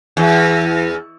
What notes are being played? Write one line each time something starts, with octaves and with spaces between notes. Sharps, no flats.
E2